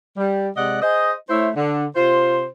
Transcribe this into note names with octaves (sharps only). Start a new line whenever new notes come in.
G3
C3 G#3 D5 D#5 F#5
G#4 C5 D#5
A3 E4 C5 C#5 E5
D3
C3 F4 C5